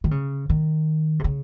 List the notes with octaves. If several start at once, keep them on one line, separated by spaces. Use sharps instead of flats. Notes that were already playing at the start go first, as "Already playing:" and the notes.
D#3
C#3
D#3
C3
C#3